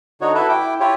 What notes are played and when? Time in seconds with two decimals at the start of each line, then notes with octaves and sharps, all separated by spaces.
0.21 D3 D#4 F#4 C#5
0.34 E4 F#4 A4 B4 E5
0.49 E4 G5 D6
0.80 E4 F4 G4 C#5